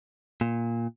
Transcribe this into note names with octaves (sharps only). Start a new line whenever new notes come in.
A#2